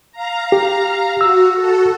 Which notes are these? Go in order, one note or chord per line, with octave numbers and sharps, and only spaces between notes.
F5 A#5
G4
F#4 E6
F#4 A4